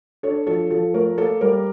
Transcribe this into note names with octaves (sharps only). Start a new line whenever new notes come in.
D4 A4 C#5
F3 A4
F3 A4
A3 A#4
A#3 A4
G3 A#4